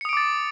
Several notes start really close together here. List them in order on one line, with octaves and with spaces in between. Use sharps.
C#7 D#6 D7 D6 A6